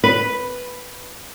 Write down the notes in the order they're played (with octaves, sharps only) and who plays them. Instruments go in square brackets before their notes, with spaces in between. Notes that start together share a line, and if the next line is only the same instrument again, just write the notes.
[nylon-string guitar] B4